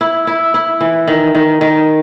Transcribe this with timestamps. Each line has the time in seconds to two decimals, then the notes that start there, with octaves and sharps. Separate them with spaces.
0.01 E4
0.27 E4
0.54 E4
0.81 E3
1.07 D#3
1.35 D#3
1.61 D#3